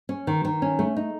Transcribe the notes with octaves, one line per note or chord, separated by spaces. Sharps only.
C#4
D#3
D#3
C#4
A3
D#4